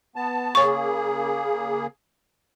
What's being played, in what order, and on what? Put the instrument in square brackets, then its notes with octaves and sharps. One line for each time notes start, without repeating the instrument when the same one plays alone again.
[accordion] B3 A5
[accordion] C#3 A#3 G#4 [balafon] C#5 C#6